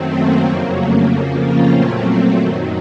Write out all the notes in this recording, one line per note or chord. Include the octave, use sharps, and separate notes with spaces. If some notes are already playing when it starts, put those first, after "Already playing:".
Already playing: F#2 D#3 F#3 A3 C4
A#3
F2 C#3 F#3 A#3
A3
F2 C#3 F3 A#3
C#4 F4
A#2 F#3 A3 C4
F#2 D#3 F#3